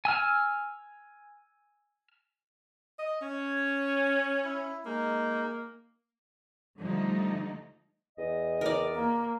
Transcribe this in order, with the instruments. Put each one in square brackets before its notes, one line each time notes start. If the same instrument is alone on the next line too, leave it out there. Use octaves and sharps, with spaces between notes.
[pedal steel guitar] G#5 E6 F6
[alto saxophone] D#5
[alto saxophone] C#4 [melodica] C#5
[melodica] E4
[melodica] G#3 D#4 [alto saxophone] A#3
[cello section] D3 F3 G3 A3 D#4
[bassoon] E2 [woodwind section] D#5
[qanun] A#4 D5
[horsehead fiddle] A#3